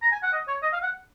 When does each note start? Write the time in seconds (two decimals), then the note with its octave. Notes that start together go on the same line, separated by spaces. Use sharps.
0.02 A#5
0.12 G#5
0.23 F#5
0.33 D#5
0.48 C#5
0.63 D#5
0.73 F5
0.83 F#5